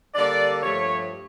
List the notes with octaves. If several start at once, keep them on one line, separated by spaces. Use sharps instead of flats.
D3 G3 A#3 D5
G2 F3 A3 C#5